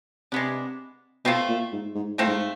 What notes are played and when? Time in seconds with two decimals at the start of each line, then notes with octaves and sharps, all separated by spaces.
0.32 C3 G#3 B3 D4
1.25 B2 A3 C4 F4 A4
1.48 A#2
1.72 G#2
1.95 G#2
2.18 A2 A3 C4 F4 A4
2.27 G#2